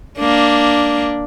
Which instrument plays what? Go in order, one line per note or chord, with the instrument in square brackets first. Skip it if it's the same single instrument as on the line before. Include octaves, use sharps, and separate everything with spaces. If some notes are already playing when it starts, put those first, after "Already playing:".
[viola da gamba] A#3 D4